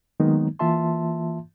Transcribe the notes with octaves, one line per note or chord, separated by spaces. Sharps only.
D#3 F#3 G#3 A#3 B3 D#4
E3 A#3 F4 E5 A5 C6